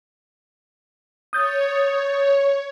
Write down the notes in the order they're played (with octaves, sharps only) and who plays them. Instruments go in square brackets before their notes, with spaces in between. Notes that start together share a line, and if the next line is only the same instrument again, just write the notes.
[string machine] C#5 [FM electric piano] D#6 G6 A6